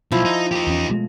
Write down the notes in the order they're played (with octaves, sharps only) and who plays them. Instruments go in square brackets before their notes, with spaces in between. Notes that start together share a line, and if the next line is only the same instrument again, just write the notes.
[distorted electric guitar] B1 [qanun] F3 E4 C5
[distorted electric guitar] D#4
D#4 G4
[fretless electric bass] E2 C#4
B2 G#3 A3